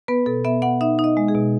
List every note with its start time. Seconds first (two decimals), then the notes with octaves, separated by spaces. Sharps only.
0.08 B3 B4
0.26 B2 A4
0.45 B3 E5
0.62 B3 F#5
0.81 D#4 E5
0.99 D#4
1.04 D#5
1.17 G#3
1.28 G#4
1.34 B2